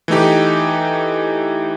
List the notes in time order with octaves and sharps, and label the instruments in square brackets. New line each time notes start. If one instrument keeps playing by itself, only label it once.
[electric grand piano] E3 A3 D#4 G4